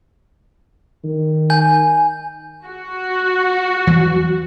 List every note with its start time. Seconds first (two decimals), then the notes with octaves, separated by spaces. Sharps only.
1.04 D#3
1.50 G#5 G6
2.65 F#4
3.87 E2 E3 F#3